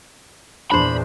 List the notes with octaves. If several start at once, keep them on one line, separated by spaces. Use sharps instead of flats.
E2 A#2 D4 C5 B5